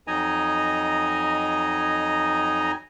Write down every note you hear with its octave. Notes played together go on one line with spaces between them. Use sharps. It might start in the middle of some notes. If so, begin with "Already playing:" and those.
F2 F#3 D#4 D#5 G#5 A#5